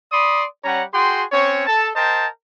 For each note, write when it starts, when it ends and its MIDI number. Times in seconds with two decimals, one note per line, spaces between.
0.12 0.44 74
0.12 0.44 83
0.12 0.44 84
0.12 0.44 87
0.64 0.83 55
0.64 0.83 61
0.64 0.83 73
0.64 0.83 78
0.64 0.83 82
0.94 1.24 66
0.94 1.24 68
0.94 1.24 79
0.94 1.24 84
1.32 1.66 60
1.32 1.66 61
1.32 1.66 73
1.67 1.89 69
1.67 1.89 81
1.95 2.27 70
1.95 2.27 72
1.95 2.27 75
1.95 2.27 79
1.95 2.27 81